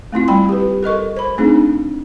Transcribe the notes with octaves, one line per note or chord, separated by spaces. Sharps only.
A3 C4 E4 F4
G3 G5 B5
G4 B4
A4 A#4 D#5 C#6
C5 B5
A3 C4 D4 D#4 G#4